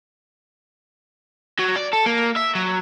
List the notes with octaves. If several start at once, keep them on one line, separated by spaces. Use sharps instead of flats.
F#3
D5
A4
A#3
E5
F#3